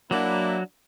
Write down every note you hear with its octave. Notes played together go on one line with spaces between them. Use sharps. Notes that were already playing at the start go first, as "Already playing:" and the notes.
F#3 A#3 D4 E4 F#5